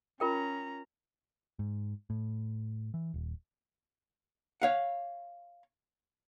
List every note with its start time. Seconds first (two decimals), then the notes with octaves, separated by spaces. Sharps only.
0.20 C#4 F4 A#4 G5 A#5
1.59 G#2
2.10 A2
2.94 E3
3.14 D#1
4.62 C#5 F5 F#5